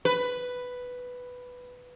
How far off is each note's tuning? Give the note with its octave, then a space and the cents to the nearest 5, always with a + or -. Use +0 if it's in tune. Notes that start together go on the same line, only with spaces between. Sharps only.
B4 +5